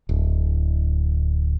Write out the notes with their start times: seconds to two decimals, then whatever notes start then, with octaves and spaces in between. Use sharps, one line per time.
0.09 D1